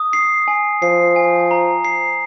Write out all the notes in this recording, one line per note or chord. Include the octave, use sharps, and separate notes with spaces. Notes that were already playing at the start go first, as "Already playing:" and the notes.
Already playing: D#6
C7
G#5
F3 C7
G#5
A#5
C7